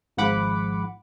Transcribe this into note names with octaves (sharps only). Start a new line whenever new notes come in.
G#1 G#2 F3 F#5 B5 D6